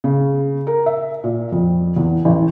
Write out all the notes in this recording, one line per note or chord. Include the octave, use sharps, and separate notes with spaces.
C#3
A#4
E5
A#2
F2
E2
A1